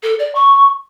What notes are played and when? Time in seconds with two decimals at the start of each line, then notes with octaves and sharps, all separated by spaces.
0.03 A4
0.19 D5
0.35 C#6